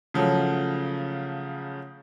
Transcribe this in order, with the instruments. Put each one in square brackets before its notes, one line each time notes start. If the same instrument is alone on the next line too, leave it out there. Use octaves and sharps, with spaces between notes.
[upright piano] C#3 F3 F#3 A3